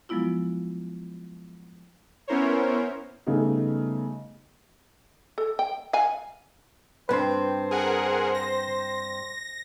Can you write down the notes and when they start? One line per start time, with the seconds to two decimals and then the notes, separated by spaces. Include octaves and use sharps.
0.09 F3 F#3 G#3 B3 E4 F4
2.28 B3 C#4 E4 A#4 C5 C#5
3.26 C#3 G3 A3 B3 D#4
5.38 A4
5.59 G5
5.93 F5 F#5 G#5
7.09 G2 C4 B4 C5 C6
7.71 G#4 A#4 F#5
8.35 A#6